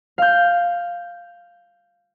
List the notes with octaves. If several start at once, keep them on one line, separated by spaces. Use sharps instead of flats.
F5 G6